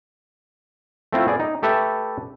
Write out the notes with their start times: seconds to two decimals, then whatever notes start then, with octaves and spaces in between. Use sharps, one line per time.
1.13 A3 C4 E4 F4
1.27 B3 G#4 D5
1.40 D#4
1.63 A3 G4 A4 B4 E5